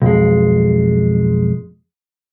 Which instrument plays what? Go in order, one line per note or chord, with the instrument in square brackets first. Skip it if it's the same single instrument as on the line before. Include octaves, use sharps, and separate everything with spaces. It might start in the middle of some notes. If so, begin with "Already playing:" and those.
[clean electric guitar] B1 F2 G#3